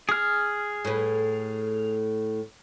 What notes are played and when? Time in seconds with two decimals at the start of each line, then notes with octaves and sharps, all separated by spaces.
0.09 G#4 F6
0.85 A2 B4